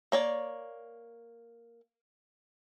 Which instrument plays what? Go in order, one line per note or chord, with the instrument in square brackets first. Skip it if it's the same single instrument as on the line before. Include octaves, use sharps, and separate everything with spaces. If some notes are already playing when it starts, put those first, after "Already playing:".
[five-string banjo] A#3 C#5 D5